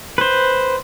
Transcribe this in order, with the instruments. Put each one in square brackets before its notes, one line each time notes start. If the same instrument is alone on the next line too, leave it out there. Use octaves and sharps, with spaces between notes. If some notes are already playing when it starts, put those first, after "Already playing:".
[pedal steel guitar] B4 C5